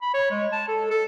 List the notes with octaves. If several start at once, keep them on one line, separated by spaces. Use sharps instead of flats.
B5
C#5
G#3
A5
A4
A4